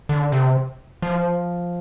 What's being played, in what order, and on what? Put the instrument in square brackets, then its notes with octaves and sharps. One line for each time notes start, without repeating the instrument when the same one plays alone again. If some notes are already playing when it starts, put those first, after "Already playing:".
[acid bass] D3
C3
F3